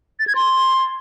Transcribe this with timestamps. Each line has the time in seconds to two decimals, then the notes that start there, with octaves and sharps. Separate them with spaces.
0.20 A6
0.27 G#6
0.35 C6